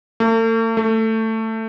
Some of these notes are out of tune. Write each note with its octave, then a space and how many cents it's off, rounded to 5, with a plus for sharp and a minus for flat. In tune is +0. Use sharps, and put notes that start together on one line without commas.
A3 +45
A3 +15